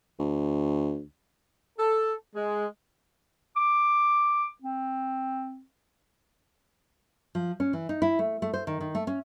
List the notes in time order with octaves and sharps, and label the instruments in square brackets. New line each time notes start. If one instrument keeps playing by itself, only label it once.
[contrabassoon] D2
[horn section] A4
G#3
[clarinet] D6
C4
[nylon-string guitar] F3
C#4
E3
D#4
E4
A3
A3
C5
D#3
D#3
A3
C#4